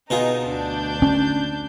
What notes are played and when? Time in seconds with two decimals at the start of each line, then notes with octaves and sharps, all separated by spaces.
0.10 B2 D#4 F4 G#4
0.44 D2 D4 G6
1.02 C#4